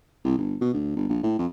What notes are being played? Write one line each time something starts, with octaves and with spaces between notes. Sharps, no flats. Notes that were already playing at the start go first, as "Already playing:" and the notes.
C2
G1
B2
D2
G1
A#1
A2
F2